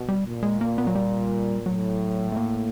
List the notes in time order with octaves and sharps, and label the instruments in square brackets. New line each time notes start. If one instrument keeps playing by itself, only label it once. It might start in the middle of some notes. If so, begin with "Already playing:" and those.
Already playing: [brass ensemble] B2
[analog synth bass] G3
[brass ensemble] A#2
[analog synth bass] G#3
A#3
B3
F#3
G3
[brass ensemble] A2 [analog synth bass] F#3
[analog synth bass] A3
A#3